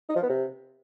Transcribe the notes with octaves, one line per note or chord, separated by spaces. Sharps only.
D#4
F3
B3
C3